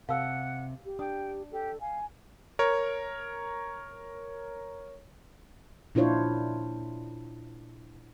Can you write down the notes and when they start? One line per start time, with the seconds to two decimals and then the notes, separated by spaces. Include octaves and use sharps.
0.09 C3 F5 F#5 A5 E6
0.85 G4
0.99 D4 G5 D#6
1.52 G4 A4
1.81 F5 G#5
2.59 A#4 C#5
5.95 A#2 D4 E4 F4 C5 C#5